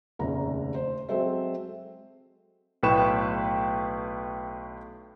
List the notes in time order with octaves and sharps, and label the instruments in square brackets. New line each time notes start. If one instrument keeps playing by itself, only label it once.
[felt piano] F1 A#1 D#2 C#3 A#5
C5
F#3 G#3 C4 A4 C5 E5
[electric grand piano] B1 A2 B4 G5 C#6 E7